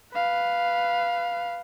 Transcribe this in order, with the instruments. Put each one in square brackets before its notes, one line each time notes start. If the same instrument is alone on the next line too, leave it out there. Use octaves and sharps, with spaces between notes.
[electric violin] B4 F5